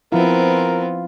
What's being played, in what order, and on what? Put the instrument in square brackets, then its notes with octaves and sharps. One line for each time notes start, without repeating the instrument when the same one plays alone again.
[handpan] F3 E4 [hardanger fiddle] B3 C4 [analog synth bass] F4 [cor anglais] A#4